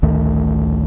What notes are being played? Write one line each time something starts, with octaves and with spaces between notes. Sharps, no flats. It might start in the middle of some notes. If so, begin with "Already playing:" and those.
A1 D2 D#3 A3